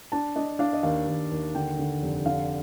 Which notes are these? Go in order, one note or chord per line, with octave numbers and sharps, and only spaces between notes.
D4 A5
D4 D#5
D4 F5
D#5
D#2 F5
D#2
D#2
D3 G5
D3
F1
D3 F5